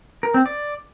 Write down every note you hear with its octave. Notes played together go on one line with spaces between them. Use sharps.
A#4
C4
D5